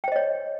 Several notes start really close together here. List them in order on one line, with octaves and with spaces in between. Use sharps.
G5 C5 D#5 C#5